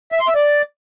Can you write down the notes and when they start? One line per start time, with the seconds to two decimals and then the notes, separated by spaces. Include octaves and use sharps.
0.12 E5
0.20 C6
0.28 E5
0.35 D5